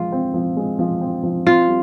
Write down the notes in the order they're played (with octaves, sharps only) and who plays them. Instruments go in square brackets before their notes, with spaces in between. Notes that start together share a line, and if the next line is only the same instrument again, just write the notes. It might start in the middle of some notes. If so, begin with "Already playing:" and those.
Already playing: [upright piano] F3 G#3 [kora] F4
[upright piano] C4
F3
G#3
F3
C4
F3
[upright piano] C4 [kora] F4
[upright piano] G3